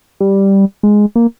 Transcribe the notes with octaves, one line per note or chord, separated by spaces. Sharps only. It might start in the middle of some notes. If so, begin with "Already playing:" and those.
G3
G#3
A#3